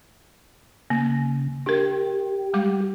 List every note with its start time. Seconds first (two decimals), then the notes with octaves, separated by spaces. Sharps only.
0.90 C#3 A#3
1.66 D4 G4 A#4
2.53 G3 G#3 D6